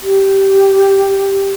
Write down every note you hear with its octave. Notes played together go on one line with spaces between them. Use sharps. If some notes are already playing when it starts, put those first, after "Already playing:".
G4